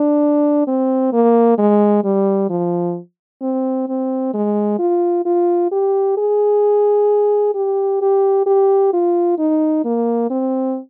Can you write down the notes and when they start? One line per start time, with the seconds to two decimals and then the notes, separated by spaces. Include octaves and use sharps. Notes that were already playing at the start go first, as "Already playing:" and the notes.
Already playing: D4
0.67 C4
1.13 A#3
1.58 G#3
2.04 G3
2.50 F3
3.42 C4
3.89 C4
4.34 G#3
4.79 F4
5.26 F4
5.72 G4
6.18 G#4
7.55 G4
8.02 G4
8.46 G4
8.93 F4
9.39 D#4
9.85 A#3
10.30 C4